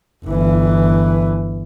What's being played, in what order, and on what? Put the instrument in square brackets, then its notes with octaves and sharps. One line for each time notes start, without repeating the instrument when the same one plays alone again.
[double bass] G1 E3